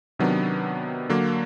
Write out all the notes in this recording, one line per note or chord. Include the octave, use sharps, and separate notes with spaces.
C3 D#3 F#3 B3 D4
D3 F#3 A#3